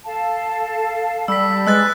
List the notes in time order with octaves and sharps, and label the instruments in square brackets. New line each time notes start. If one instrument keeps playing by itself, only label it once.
[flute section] A4 F5 A5
[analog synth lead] G3 [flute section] A5 B5 [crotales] E6 B6
[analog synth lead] G#3 [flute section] B4 [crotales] E6 F#6 A6